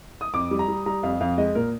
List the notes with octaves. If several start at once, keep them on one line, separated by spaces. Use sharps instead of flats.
D#6
F2 D6
G3
A#5
G3
G3 A#5
F2 F5
F2 F5
G#3 D#5
A#2 A#4